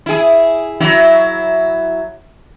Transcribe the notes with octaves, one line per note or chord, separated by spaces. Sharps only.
E4 G#4
F#3 E4